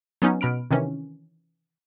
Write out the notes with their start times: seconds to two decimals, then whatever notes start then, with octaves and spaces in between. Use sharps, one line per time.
0.22 F#3 B3 C#4 D#4
0.41 B2 B5 F6 D7
0.71 C3 D#3 E3 C#4